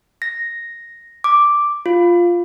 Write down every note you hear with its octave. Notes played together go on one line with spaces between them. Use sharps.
A#6
D6
F4